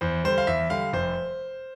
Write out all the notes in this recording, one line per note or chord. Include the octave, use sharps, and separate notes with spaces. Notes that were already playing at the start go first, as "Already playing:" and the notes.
E2 C5
D3 G3 C5
F5
E2 E5
D3 G3 F5
F1 C5